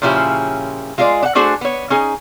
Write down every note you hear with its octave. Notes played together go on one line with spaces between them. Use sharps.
A#2 C#3 F3 C#4 E4 G4
G#3 F4 G#4 A#4 D5
D4 F#5
A3 D4 F#4 G#4 C5
B3 C#5
C#4 D#4 G#4